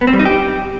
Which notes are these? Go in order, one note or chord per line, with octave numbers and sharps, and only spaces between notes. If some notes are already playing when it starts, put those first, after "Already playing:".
B3
C4
G3
D#4
G4